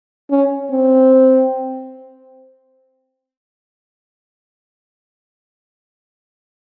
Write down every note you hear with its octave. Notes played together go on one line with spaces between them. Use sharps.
C#4
C4